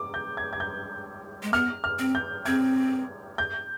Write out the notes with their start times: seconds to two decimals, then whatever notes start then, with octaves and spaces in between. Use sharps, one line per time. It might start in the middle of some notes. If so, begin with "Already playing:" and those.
Already playing: D6
0.14 G6
0.37 G#6
0.53 G#6
0.60 G6
1.43 G#3
1.53 B3 F6
1.84 F6
1.99 C4
2.15 G6
2.46 C4 G#6
3.38 G6